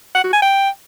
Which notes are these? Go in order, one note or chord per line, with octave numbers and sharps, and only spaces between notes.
F#5
F#4
G#5
G5